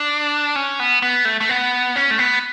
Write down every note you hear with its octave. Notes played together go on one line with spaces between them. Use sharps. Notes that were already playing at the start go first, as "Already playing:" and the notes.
Already playing: D4
C#4
B3
B3
A3
A3
B3
C#4
A3
B3